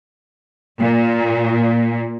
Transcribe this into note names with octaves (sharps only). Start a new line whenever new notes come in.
A#2